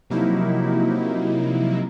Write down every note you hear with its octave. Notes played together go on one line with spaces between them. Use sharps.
C3 F3 F#3 A#3 D#4 E4